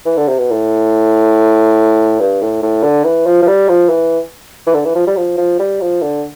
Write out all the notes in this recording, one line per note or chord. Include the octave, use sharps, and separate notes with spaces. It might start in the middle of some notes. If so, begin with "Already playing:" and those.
E3
D3
C3
B2
A2
G2
A2
A2
D3
E3
F3
F3
G3
F3
E3
E3
D3
E3
F3
G3
F3
F3
G3
F3
D3